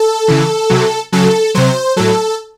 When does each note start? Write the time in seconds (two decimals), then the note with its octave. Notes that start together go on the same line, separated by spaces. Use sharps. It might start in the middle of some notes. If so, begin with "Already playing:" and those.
Already playing: A4
0.28 C#3 E3
0.70 C3 F#3
1.12 C#3 F#3 A4
1.55 C3 F#3 C5
1.96 A2 F#3 A4